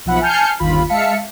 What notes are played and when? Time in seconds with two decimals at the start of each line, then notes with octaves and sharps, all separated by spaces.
0.05 B1 F3 E5 F#5 B5
0.21 G#5 A5 F6 G6 C7 C#7
0.60 G1 D#2 F4 B5
0.88 G#3 E5 F5 A5 B6 C#7